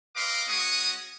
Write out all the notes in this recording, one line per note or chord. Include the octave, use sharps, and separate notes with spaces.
A#4 B4 D#5 F5 C6 D6
G#3 C#4 F#4 C#6 D#6